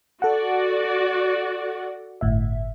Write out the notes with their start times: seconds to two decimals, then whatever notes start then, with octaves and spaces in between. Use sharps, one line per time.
0.22 F#4 A4 D5 F#5
2.21 G1 A2 E5